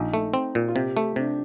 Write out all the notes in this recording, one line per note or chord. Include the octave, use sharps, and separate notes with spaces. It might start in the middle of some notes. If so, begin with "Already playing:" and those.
Already playing: A#1 D#4
A3
C4
A#2
F4
C3 G4
A3
C3 D4